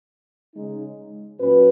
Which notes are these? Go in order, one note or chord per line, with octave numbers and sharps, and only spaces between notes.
C#3 G#3 D#4
A#2 F#3 C#4 F#4 B4